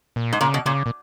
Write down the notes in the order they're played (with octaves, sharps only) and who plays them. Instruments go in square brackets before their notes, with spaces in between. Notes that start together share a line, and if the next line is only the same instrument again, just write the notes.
[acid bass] A#2
[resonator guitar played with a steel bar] G#2
[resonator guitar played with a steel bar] A#2 [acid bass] C#3
[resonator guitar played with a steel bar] B2
[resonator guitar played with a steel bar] A#2 [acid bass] C#3
[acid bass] A#2